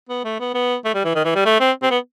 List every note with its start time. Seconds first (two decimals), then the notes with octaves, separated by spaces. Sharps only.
0.09 B3
0.25 A3
0.40 B3
0.54 B3
0.85 A3
0.94 G3
1.05 E3
1.15 D#3
1.25 E3
1.35 G3
1.46 A3
1.60 C4
1.83 C4
1.91 B3